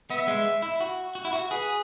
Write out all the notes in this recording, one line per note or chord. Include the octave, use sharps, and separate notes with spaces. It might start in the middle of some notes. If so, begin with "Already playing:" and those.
B3 E5
G#3
E4
F#4
F#4
E4
F#4
G#4 B4